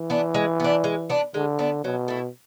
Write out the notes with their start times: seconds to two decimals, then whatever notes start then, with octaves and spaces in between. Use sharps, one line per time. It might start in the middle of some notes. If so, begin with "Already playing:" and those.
Already playing: E3
0.10 B3 D4
0.34 G#3
0.60 B3 D4
0.84 G#3
1.10 B3 D4
1.34 D3 G#3
1.59 B3 D4
1.84 B2 F#3
2.08 A3 E4